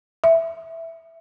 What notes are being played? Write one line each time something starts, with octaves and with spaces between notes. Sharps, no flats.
E5